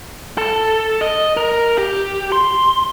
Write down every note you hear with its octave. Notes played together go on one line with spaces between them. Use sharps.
A4
D#5
A#4
G4
C6